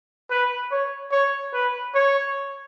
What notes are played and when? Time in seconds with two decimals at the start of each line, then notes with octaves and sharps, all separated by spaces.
0.31 B4
0.71 C#5
1.12 C#5
1.54 B4
1.95 C#5